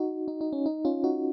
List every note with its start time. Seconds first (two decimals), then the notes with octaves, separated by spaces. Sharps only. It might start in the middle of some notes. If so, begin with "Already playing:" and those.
Already playing: D#4 F#4
0.28 D#4
0.41 D#4
0.53 C#4
0.66 D#4
0.85 C#4 F4
1.04 D#4 F#4